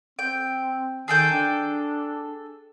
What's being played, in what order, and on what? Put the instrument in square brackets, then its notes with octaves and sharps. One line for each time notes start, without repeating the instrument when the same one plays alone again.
[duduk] C4 [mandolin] G5
[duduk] D#3 [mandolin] G#4 A4 G5
[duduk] D4